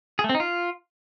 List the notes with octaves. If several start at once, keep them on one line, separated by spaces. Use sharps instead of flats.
G#4
A3
C4
D#4
F4